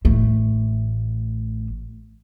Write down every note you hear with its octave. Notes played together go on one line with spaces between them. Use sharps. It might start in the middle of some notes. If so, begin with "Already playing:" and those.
A1 A3